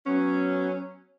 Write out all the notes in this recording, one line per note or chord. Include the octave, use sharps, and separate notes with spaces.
F#3 B3 C#4